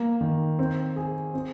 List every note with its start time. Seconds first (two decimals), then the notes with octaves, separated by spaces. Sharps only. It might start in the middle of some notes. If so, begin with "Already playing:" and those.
Already playing: A#3
0.21 D#3
0.59 C4
0.96 G#4
1.34 C4